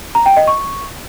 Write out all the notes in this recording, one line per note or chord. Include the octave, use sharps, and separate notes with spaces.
A#5
G5
D#5
C#6